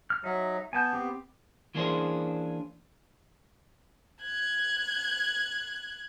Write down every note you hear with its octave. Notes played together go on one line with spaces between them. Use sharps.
F6
F#3 D#4 E5
B3 G#5 A5 G6
C4 G4
E3 A#3 C#4 D4 G#4 C5
F#6 G#6